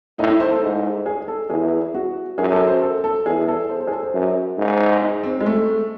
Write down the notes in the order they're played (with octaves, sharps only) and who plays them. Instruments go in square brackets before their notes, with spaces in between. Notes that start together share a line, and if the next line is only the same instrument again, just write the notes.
[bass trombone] A2 [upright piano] D#4
[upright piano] E4
C5
A4
[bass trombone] G#2
[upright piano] G#4
A4
[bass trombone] E2 [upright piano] G#4
[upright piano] F#4
[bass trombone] F#2 [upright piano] G#4
[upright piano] A4
C5
A4
A4
[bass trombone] E2 [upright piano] G#4
[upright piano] A4
C5
C5
G#4
A4
C5
[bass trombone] F#2
G#2
[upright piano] D#4
C4
G#3
A3